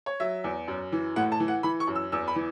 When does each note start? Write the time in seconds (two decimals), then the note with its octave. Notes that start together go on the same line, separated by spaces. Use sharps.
0.06 C#5
0.20 F#3 E5
0.44 E2
0.68 F#2
0.92 E3
1.16 A2 F#5
1.32 A5
1.40 E3
1.48 F#5
1.63 E3 B5
1.80 C#6
1.87 F#2
1.95 E6
2.12 E2 E6
2.28 B5
2.36 E3